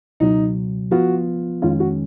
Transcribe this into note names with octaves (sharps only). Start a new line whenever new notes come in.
C#2 B2 F#3 D#4
F3 B3 F4 F#4
F2 D#3 G#3 C#4 F4
F#4